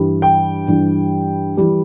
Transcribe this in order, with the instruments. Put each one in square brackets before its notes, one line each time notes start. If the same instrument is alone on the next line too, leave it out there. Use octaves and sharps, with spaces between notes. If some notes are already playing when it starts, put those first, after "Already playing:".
Already playing: [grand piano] G2 E3 G3
G5
G2 E3 G3
E3 G3